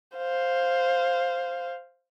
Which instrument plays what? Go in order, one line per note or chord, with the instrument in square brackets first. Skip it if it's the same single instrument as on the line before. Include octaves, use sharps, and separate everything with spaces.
[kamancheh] C5 F5